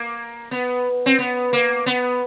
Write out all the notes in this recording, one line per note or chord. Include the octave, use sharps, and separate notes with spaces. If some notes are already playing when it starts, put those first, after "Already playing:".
Already playing: A#3
B3
C4
B3
A#3
B3